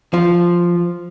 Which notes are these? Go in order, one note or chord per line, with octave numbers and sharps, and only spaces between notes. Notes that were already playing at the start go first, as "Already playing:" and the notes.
F3